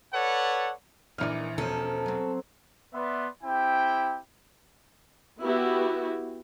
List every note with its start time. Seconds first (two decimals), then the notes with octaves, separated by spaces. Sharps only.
0.14 A4 B4 C#5 D5 F#5
1.18 A#1 E3 D#4 A#4 D5 F6
1.58 E1 F3 C#4 A4
2.06 F#3 C4
2.94 B3 B4 D5 E5 C6
3.43 C4 E4 G4 G5
5.42 B3 E4 F#4 G4